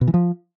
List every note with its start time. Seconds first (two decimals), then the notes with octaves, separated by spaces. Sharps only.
0.01 B2
0.08 E3
0.14 F3